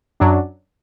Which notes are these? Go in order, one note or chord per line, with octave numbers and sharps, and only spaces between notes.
F#2 F#3 D4